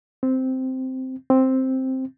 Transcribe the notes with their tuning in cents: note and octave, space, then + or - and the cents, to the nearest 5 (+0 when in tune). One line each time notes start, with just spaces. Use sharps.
C4 -5
C4 +5